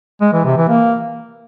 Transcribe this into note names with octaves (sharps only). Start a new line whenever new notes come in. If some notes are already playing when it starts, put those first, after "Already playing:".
G#3
E3
C3
E3
A#3